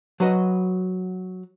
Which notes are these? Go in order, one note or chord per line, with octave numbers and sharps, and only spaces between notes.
F#3 F#4 B4 D#5